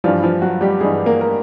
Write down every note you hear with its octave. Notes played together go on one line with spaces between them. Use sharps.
G2 E3 F3 G3 F4
F3 F4
F#3 F#4
G3 G4
G2 E3 G3 G#3 G#4
A#3 A#4
A#4